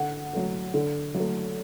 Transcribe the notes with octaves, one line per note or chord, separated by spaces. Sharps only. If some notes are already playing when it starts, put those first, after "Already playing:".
Already playing: D3 F#5
F#3 A3
D3
F#3 A3